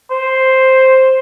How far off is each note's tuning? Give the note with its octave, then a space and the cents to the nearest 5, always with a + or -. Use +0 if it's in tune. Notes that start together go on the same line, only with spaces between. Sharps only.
C5 +5